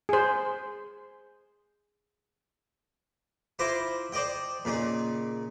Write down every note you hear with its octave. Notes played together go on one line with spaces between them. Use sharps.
G#4 C5
E4 F4 C5 A#5 C6 D6
C5 D5 D#5 G5
A#2 C#3 D#4